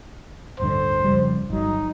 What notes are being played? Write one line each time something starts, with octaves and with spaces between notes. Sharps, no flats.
D1 G2 D3 C5
F2 C#3 G3
G1 F#3 D#4